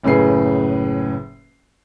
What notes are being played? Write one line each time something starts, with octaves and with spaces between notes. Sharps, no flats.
F#1 A2 C#3 G#4 B4 C7